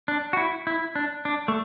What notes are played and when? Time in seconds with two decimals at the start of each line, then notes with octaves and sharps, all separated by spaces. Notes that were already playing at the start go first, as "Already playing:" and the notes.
0.08 D4
0.33 F#4
0.37 E4
0.67 E4
0.95 D4
1.25 D4
1.48 A3